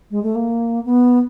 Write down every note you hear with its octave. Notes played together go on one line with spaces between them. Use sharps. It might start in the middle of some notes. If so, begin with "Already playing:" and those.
G#3
A3
A#3
B3